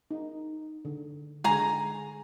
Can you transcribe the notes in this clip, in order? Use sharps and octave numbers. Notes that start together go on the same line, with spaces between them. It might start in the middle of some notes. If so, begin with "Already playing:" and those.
D#4
D3
D3 G#3 G#4 G#5 A#5